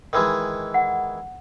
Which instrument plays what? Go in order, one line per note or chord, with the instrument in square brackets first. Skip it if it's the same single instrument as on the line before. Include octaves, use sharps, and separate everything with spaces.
[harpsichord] D#3 E3 G#3
[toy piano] F#5